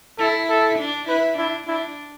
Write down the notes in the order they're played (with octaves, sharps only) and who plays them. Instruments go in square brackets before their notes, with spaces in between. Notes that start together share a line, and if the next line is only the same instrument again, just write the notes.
[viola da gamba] E4 [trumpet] A4
[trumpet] A4
[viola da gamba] D4
[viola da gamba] E4 [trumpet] B4
[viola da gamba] D4 [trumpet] E4
[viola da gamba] D4 [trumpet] E4